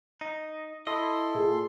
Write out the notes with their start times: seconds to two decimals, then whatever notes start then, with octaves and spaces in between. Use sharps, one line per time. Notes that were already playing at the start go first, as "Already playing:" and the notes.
0.21 D#4
0.87 E4 A4 D#5 C6
1.35 A#2 G#4